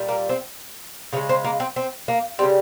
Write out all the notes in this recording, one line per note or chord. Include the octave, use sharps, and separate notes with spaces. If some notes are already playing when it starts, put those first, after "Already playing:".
Already playing: A#2 G3
A#3
C4
C#3 F3 G#3 C#4
C4
A#3
C4
C4
A#3
C#3 G3 C4